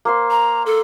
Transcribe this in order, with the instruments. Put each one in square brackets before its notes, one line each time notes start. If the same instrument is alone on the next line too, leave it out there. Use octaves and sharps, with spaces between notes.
[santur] A#3 C5 C6
[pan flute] A#5
A4